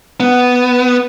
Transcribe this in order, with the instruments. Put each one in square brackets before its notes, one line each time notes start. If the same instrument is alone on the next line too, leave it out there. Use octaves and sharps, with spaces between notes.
[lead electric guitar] B3